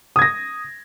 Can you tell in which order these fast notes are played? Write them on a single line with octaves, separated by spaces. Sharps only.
D#6 G#6 A#6